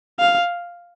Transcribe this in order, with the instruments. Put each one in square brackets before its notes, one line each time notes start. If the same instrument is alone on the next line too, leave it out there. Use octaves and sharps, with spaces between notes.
[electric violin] F5